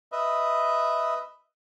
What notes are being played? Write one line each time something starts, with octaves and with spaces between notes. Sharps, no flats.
B4 D#5 E5